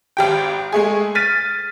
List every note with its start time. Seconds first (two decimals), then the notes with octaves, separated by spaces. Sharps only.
0.17 G#1 G4 G5
0.72 G#3 A3 G#4
1.15 F6 A6 B6 D#7